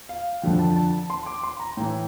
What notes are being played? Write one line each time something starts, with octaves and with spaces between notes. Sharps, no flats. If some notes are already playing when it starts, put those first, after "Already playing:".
F5
F2 D3 F3 G5
A5
A5
C6
D6
C6
A#5
A2 E3 G5